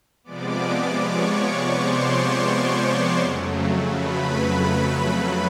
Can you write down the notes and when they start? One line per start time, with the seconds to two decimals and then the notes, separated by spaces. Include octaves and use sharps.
0.24 C3 F3 G#3 B3 D5 D6
0.98 C#5 C#6
1.35 C#5 C#6
1.73 C5 C6
3.20 F2 C#3 F#3 A3
3.94 B4 B5